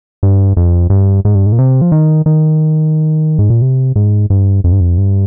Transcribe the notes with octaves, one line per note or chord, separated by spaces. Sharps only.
G2
F2
G2
G#2
G2
G#2
A#2
C3
F3
D#3
D#3
G#2
A#2
C3
G#2
G2
F2
G2
F2
G2